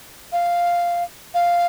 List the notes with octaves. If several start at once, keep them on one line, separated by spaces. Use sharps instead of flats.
F5
F5